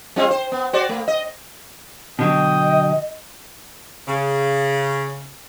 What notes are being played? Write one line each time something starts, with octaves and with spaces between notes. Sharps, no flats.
G3 C4 F4
C5
B3
F#4 C5 D5
A3
D#5
B2 D3 F#3 D#5 G5 D#6
C#3